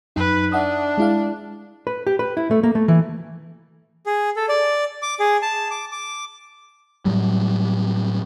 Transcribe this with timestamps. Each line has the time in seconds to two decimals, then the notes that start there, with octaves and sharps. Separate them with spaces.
0.16 F#2 D#4 B4
0.52 D4 E5 F#5 D#6
0.98 G#3 E4 F5
1.87 B4
2.07 G4
2.19 B4
2.37 E4
2.51 A3
2.63 A#3
2.75 A3
2.88 E3
4.06 G#4
4.36 A4
4.49 D5
5.02 D6
5.20 G#4
5.42 A5
5.71 D6
5.92 D6
7.05 A2 F#3 G3